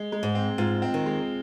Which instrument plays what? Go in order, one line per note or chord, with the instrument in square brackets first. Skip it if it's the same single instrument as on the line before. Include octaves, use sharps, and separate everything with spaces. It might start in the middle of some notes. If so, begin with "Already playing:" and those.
Already playing: [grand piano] G#3
G#3
[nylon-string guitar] G#2
[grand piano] C4
[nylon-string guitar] G#2 [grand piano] F4
[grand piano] C4
[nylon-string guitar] D#3
[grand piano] G#3